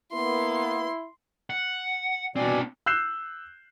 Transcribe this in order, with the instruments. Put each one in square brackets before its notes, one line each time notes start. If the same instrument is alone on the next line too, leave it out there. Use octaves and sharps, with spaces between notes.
[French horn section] A#3 B3 [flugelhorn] E4 [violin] C6
[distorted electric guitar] F#5
[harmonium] B2 D5 G#5 [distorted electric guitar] C4 D4
[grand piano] E6 F#6 G6 C7 E7